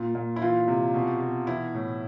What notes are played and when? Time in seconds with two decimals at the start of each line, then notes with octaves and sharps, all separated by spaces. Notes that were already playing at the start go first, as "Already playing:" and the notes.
Already playing: A#2 F4
0.15 A#2
0.36 E4
0.42 E3 F4
0.68 C3
0.94 B2
1.21 B2
1.47 E3 E4
1.74 A2